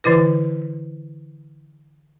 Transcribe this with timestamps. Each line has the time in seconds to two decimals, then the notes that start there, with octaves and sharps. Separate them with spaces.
0.04 D3 E3 E4 B4